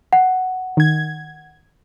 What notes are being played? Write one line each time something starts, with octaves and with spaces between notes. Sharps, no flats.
F#5
D#3 G#6